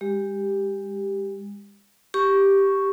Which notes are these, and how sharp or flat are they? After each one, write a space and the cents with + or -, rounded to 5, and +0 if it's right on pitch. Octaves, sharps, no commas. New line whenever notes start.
G#3 -35 G4 +0
G4 +0 C#6 +0